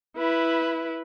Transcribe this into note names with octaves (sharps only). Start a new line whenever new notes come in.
E4 B4